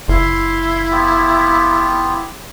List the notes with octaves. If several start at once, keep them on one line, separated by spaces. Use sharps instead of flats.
F#1 E4 F5 C6
B3 F4 G4